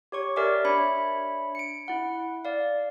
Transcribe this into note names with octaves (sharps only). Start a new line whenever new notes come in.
G4 C#5 C#6
G4 A#4 D5 E5 G#5 D6
D4 C#5 E5 B5 C#7
C#7 D7
E4 F#5
D5 F5